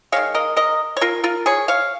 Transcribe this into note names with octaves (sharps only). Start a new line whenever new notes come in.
D#3 G#3 C#5 F5
A#4 D#5
A#4 D#5
C#5
F4 A#4
F4 A#4
G#4 C#5
C#5 F5